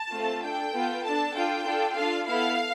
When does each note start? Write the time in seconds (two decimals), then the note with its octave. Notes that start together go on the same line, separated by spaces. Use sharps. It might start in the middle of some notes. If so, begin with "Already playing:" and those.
Already playing: A5
0.13 A3 C4 F4 A4
0.44 D4 A4 G5
0.74 B3 F4 A4
1.05 D4 A4 A5
1.35 D4 F4 A4 G5
1.66 D4 F4 A4
1.97 D4 F4 A4 F5
2.27 B3 E4 A4 F5